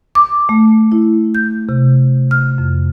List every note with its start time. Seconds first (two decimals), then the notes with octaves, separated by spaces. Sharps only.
0.15 D6
0.49 A3
0.92 E4
1.35 G6
1.69 C3
2.31 F6
2.58 F2